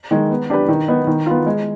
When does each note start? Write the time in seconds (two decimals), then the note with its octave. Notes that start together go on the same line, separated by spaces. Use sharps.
0.11 D#3 G#3
0.30 B3
0.50 D4 G4 B4
0.68 D#3
0.88 B3 D#4
1.07 D#3
1.26 B3 F4
1.46 G#3